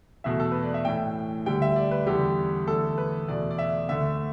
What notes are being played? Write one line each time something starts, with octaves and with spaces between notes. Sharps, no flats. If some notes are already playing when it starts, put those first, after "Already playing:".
E2 B2 A3 E5
A4
B4
D5
E5
A2 E3 A3 G5
D2 D3 G3 G5
E5
D5
B4
E2 D3 G3 G4
E2 D3 A3 A4
B4
E2 B2 A3 D5
D5
E5
D2 D3 A3 E5